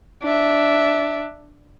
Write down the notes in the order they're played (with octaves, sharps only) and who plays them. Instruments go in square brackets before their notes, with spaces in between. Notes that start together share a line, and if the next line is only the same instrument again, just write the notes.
[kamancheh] D4 E5